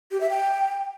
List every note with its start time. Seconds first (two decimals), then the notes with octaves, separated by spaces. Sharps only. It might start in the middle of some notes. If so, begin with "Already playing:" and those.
0.11 G4
0.21 E5
0.30 G5